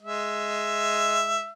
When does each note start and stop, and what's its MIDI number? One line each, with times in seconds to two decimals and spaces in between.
0.02 1.50 56
0.02 1.50 76